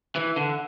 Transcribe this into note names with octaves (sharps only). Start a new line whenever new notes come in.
E3
D3